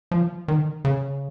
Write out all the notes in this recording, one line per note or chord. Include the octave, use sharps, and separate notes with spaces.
F3
D#3
C#3